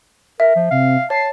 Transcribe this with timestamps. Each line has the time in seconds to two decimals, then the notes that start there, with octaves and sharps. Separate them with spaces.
0.40 A#4 E5
0.56 F3
0.71 C3 F5
1.10 C#5 A5 C7